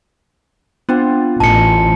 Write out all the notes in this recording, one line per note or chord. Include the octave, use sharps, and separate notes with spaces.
B3 C4 D4 F4 F#5
A1 A#4 D#5 G#5 A5 C#7